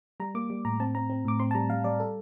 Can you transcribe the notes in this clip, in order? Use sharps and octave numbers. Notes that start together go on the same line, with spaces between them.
G3 A#5
A#3 D6
G3
A2 A#5
C4 A5
C4 A#5
C4
A2 D6
C4 C6
A5
G3 A#5
G3 F5
G3 D5
A4